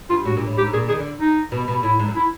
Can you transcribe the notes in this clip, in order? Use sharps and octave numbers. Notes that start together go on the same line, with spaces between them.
G2 F4
A2 F#4
A#2
A2
G#2 G4
A2
A#2 G#4
D#3 G#4
D3
D#4
B2
B2
A2 E4
G#2
F#2
E4